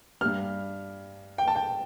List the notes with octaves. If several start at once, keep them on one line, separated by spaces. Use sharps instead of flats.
G2 G3 F6
G5
A5
G5